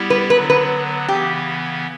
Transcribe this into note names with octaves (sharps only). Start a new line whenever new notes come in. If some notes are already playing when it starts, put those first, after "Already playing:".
Already playing: G3 B3 E4 G4
B4
D3 F#3 B3 B4
B4
C#3 E3 B3 G4